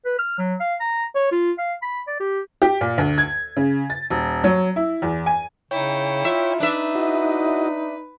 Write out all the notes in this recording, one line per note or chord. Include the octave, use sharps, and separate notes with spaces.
B4
F6
F#3
F5
A#5
C#5
F4
F5
B5
D5
G4
G4
A#2
D2
G#6
C#3
A6
D#1
F#3
E4
E2
G#5
C#3 D#4 E4 C#5 G5
F4 E5
D4 D#4 B4 E5
E4 F#4 D#5